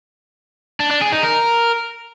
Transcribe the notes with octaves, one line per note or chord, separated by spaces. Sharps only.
D4
D4
G#4
D#4
A#4